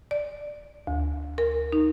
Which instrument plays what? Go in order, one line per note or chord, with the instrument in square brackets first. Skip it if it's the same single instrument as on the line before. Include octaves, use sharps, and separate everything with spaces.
[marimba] D5
D2
A#4
D#4